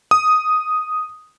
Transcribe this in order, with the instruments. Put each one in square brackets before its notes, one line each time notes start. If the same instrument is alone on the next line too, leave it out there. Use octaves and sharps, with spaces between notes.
[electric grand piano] D#6